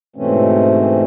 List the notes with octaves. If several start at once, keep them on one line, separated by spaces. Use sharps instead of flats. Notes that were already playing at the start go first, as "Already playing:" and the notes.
G#2 B2 E3 A3 C4 C#4